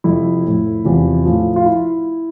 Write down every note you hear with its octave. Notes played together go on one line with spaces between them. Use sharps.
F2 C3 F3 E4
A2 F3
E2 C3 F3
A2 F3
F4
E4